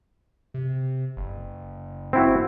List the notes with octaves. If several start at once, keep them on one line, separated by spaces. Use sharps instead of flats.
C3
F#1
C4 E4 F#4